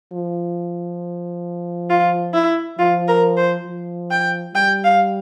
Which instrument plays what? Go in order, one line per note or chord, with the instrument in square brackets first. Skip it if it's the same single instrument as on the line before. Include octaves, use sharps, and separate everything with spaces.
[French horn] F3
[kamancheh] F4
E4
[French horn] F3 [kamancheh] F4
[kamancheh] A#4
C5
[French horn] F3
[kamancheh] G5
[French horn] G3 [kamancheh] G5
[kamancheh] F5